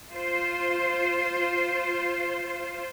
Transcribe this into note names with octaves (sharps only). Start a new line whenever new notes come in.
F4 C5